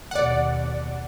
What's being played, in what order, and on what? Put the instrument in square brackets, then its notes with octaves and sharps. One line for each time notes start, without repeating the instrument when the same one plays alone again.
[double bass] D#2 B2 [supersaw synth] D5 F#5